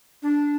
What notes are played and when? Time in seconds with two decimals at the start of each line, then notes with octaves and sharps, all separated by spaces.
0.23 D4